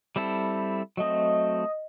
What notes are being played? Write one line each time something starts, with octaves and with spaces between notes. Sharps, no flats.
G3 C4 E4 A4
F#3 A3 C4 D#5